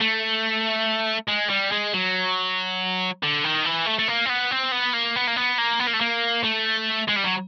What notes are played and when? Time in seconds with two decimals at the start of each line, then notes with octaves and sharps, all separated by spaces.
0.01 A3
1.29 G#3
1.50 G3
1.72 G#3
1.94 F#3
3.23 D3
3.44 D#3
3.65 E3
3.86 A3
3.99 A3
4.08 A#3
4.25 C4
4.29 B3
4.51 C4
4.72 B3
4.94 A#3
5.16 B3
5.27 A#3
5.36 B3
5.58 A#3
5.79 B3
5.87 A#3
5.93 A3
6.01 A#3
6.44 A3
7.09 G#3
7.17 G3
7.25 F#3